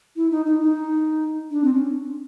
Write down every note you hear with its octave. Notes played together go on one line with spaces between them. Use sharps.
E4
D#4
D#4
D#4
D4
C4
C#4